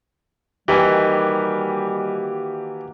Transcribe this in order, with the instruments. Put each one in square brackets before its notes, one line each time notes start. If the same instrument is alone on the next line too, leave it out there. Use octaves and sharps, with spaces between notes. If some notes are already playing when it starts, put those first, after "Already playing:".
[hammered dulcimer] D#3 A#3 F#4 [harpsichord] E3 [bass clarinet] G3 [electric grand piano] G4 G#5